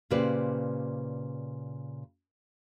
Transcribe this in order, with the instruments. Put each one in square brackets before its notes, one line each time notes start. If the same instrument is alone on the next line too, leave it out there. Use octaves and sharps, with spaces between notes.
[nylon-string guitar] A#2 C#3 G4 B4 C5 D5